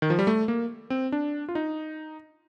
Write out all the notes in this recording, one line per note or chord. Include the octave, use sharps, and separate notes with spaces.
D#3
F3
G3
A3
A#3
C4
D4
F4
D#4